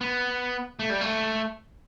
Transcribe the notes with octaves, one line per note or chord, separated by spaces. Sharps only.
B3
A3
G3
A3